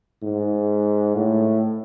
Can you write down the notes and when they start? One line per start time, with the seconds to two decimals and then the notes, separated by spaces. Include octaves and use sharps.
0.23 G#2
1.16 A2